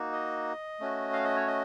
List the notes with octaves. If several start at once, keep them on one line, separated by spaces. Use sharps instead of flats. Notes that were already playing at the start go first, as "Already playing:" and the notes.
Already playing: A#3 D#4 F#4
D#5
A3 C#4 F#4
F5
D#5
C#5
D#5